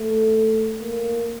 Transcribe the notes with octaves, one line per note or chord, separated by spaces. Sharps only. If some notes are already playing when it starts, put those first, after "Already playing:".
Already playing: A3
A#3